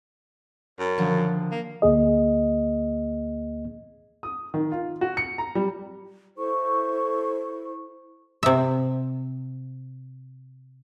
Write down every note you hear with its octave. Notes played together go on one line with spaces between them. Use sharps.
F#2
D3 D#3 F3
A#3
D2 A#3 G#4 D#5
D#6
D#3
F4
F#4
C#7
A#5
G3
E4 A4 C5 C#6
C3 E5